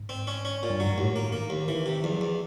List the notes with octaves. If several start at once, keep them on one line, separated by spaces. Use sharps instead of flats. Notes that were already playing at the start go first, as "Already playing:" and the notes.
Already playing: G#2
C4
C#4
C#4
A#2
G2
G#2 F#3
D#2 A2
A#3
D#3 A#3
D#2
D#3 E3
C3
E2 F3
F#3
E2 F3